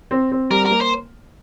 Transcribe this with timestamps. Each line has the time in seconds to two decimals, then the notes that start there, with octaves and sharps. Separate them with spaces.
0.11 C4
0.32 C4
0.51 G3 A#4
0.66 A#4
0.71 A#3
0.81 C5